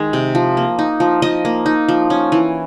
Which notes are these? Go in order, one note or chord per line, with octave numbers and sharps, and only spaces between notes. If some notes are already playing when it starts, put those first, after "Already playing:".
Already playing: D#3 G#3
C3
F3
A#3
D#4
F3
F3 D#5
A#3
D#4
F3
C#4
E3